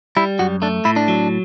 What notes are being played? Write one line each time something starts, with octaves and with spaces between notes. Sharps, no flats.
G3 E4
F#2 F#4
A3 D4
A2 E4
D4
F#3